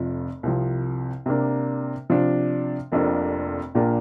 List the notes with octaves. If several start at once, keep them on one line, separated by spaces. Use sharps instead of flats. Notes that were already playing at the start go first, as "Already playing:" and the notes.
Already playing: F1 F2 F3
C2 C3 F3
C3 A#3 D4
C3 F3 D4
F1 F2 C3 A#3 D4
A#1 A#2 A#3 D4